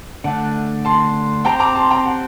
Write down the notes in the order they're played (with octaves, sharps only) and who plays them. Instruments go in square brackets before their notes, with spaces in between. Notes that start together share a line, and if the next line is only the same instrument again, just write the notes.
[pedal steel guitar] D3 A3 D4 [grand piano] F#5 A5
[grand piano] A5 C6
[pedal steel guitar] C4 G4 C5 [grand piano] G5 A#5
[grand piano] A#5 D6
A5 C6
G5 A#5
F#5 A5